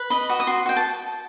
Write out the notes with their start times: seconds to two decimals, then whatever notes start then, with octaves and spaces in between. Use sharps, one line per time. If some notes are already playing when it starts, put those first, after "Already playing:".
Already playing: B4
0.10 D#5 B5
0.29 F#4 D#6
0.40 D#6
0.47 F#4 C6
0.66 F#4 G5
0.76 A5